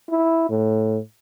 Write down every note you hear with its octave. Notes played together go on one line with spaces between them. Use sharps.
E4
A2